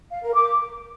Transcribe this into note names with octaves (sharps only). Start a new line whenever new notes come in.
F5
A#4
D6